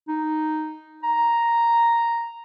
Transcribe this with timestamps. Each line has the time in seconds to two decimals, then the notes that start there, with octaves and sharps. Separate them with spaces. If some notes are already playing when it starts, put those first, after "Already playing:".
0.08 D#4
1.03 A#5